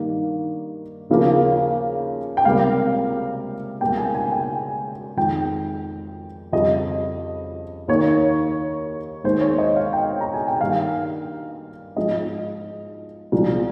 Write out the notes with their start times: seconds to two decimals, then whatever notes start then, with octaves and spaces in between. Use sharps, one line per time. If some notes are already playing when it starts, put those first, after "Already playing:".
Already playing: G2 D#3 G3 A#3
1.10 D#2 C#3 F3 A#3
2.37 G5
2.45 C#2 C3 G3 A#3 F5
3.81 C#2 C#3 G3 A#3 G5
3.97 G#5
4.15 G#5
4.32 G5
5.17 F2 D#3 G#3 G5
6.53 F2 C#3 G3 D#5
7.88 D#2 D#3 A#3 C#5
9.24 D#2 D#3 G#3 C5
9.41 C#5
9.58 D#5
9.76 F5
9.93 G5
10.21 A#5
10.34 G#5
10.48 G5
10.61 G2 D#3 G3 A#3 F5
11.96 G#2 F3 G#3 D#5
13.32 C2 A#2 F3 G#3